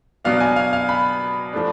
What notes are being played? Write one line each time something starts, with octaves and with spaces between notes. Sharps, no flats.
B2 F#3 B3 D4 F5
G#5
F5
F5
B5
F3 A3 D4